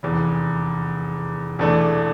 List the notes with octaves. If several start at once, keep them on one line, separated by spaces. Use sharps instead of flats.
F1 E2 E3
E1 E2 E3 A3 D4